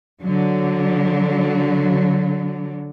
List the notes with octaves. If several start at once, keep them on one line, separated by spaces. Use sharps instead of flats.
D3 F#3